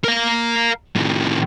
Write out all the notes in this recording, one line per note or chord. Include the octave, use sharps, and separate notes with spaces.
A#4 F5
A2 D#3